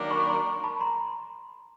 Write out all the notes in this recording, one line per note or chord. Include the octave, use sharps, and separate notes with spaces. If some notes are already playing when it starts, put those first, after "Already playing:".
Already playing: D#3 F#3 A#3 D4 A#5
B5 C#6
A#5 C6
A5 B5
A#5 C6